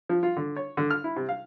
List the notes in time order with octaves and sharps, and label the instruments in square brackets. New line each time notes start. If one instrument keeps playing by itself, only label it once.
[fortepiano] F3
F4
D3
C#5
D3
F6
E4
C3
F5